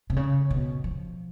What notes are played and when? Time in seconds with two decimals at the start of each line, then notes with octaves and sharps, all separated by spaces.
0.10 C3
0.16 C#3
0.51 B2
0.84 F3